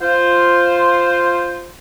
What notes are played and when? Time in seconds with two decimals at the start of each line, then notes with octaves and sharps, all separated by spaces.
0.01 F4 C5